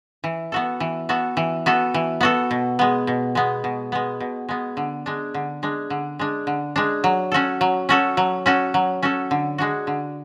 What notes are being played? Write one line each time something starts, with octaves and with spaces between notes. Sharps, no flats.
E3
B3 F#4 A4
E3
B3 F#4 A4
E3
B3 F#4 A4
E3
B3 F#4 A4
B2
G#3 B3
B2
G#3 B3
B2
G#3 B3
B2
G#3 B3
D3
G#3 D4
D3
G#3 D4
D3
G#3 D4
D3
G#3 D4
F#3
C#4 F#4 A4
F#3
C#4 F#4 A4
F#3
C#4 F#4 A4
F#3
C#4 F#4 A4
D3
G#3 D4 F#4
D3